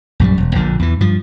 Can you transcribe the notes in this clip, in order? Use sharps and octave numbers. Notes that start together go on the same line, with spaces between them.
A#1 F#2 F3 G3
E1
A#1 A#2 D3
E2 E3
G2 F3